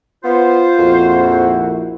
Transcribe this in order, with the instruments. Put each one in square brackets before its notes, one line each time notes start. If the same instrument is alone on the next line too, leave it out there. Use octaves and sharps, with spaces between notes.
[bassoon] B3 [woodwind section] F4 C5
[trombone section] A#1 E4 F#4 [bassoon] F2